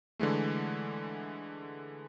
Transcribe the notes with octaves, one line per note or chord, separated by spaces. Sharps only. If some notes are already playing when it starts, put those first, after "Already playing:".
D3 E3 G#3 A3